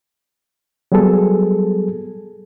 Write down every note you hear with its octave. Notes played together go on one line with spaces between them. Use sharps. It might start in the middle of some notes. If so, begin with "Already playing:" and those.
F#3 G3 B3 G#4 A4